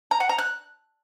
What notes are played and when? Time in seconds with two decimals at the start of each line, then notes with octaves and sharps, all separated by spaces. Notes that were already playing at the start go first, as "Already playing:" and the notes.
0.11 A#5
0.20 F#5
0.29 A#5
0.38 F#6